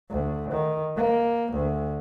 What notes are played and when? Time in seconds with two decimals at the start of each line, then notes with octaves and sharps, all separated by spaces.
0.10 D2
0.51 D#3
0.96 A#3
1.53 D2